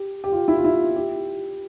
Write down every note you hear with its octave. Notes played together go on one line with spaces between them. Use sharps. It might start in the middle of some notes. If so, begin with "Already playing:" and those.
Already playing: G4
G4
F4
E4
F4
E4
G4